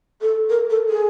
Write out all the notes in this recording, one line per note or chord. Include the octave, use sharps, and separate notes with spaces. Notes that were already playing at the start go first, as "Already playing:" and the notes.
A4
A#4
A4
G#4